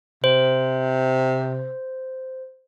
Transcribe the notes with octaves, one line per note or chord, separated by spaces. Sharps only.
C3 C5